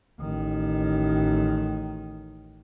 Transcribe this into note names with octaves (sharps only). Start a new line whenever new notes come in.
A1 D#3